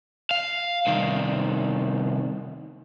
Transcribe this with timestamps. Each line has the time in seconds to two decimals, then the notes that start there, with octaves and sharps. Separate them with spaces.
0.31 F5
0.87 C2 D#3